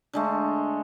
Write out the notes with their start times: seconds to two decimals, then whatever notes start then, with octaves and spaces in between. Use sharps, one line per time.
0.13 D3 G#3 A3